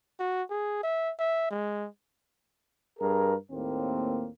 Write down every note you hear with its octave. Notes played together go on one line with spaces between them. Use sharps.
F#4
G#4
E5
E5
G#3
G2 G#4 A#4
D#2 A2 A#3 C4